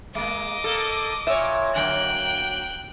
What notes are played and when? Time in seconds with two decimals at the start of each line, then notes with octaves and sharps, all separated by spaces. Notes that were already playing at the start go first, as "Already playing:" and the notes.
0.15 G#3 A#3 D#5 D6
0.64 A#3 A4
1.27 A#2 C#5 E5
1.75 D3 F#3 A#3 G5 F#6